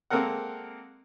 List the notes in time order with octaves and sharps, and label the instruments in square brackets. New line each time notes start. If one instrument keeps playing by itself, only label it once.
[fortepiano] G#3 A#3 C4 A4 A#4 F#5